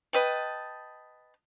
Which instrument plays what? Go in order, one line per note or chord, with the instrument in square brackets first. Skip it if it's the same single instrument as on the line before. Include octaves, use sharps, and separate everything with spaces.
[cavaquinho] B4 D#5 G5 A5